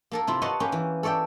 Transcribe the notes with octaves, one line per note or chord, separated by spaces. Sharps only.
A#3 A4 A#4
C3 E4 F4
B4 C#5 D#5 F#5 A5 C6
A#3 C#4 G4 B4
E3
A4 C#5 D5 E5 G5